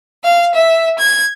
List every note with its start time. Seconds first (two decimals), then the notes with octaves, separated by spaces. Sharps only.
0.23 F5
0.53 E5
0.98 G#6